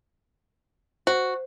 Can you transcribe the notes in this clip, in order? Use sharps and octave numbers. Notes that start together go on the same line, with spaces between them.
F#4 C5